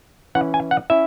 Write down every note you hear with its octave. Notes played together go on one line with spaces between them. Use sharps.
E3 C#4 E4 F#5
G#5
F#5
C#4 E4 E5